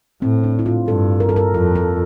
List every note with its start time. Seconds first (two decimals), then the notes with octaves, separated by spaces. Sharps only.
0.22 A2 C4
0.44 D4
0.59 E4
0.66 F4
0.88 G2 A4
1.20 A#4
1.29 A4
1.36 A#4
1.54 F2 A4
1.75 A4